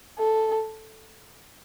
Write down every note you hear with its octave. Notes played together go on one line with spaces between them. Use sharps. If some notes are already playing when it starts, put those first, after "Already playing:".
A4